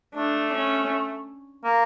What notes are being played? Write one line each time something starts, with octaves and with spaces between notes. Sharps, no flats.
A3 D4
C#4
A#3